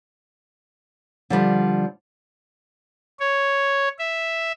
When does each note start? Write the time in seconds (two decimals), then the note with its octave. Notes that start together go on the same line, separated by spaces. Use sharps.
1.30 D3 F3 G3
3.20 C#5
3.99 E5